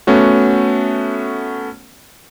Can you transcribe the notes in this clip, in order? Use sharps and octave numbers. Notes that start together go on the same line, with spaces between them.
A3 B3 C#4 F#4